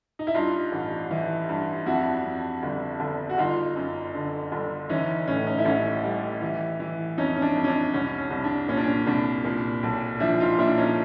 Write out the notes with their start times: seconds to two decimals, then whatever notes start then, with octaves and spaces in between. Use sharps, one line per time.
0.19 D#4
0.27 E4
0.34 G2 D#4 F4
0.72 A1
1.11 E3
1.49 G2
1.86 F2 E4 F#4
2.24 F2
2.63 G1
3.00 G1
3.29 F#4
3.38 G1 D#4 F4
3.76 F#2
4.15 D3
4.52 G1
4.89 E3 C#4 D#4
5.27 A2 C#4
5.46 C#4 D#4
5.58 E4
5.65 A1 C#4 D#4
6.04 G3
6.42 E3
6.80 E3
7.18 F2 C#4 D#4
7.36 C#4
7.42 D4
7.56 F2
7.64 C#4
7.68 D4
7.94 C2 C#4
8.18 C#4
8.31 C2
8.44 D4
8.69 A#2 C#4
8.77 D4
8.84 C#4
9.07 C2 D4
9.45 A#2
9.83 B1
10.20 F3 D4 E4
10.40 D#4 F4
10.58 A#2 D4 E4
10.78 C#4 D#4